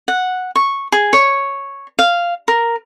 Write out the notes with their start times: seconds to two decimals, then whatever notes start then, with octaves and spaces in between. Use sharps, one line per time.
0.08 F#5
0.56 C#6
0.92 G#4
1.13 C#5
1.99 F5
2.48 A#4